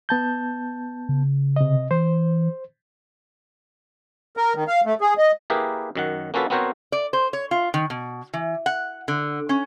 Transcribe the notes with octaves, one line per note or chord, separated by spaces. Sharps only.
B3 A5 G6
C#3
C3 D#5
E3 C5
A#4
D#3
F5
A3
G#4
D#5
A#3 E4 G4 G#4 A#4 B4
F#2 D#3 F#5
A#3 C#4 F4 F#4 A4 B4
B3 C4 F#4 A#4 C5 C#5
D5
C5
C#5
F4
D#3
B2
E3
F#5
D3
C#4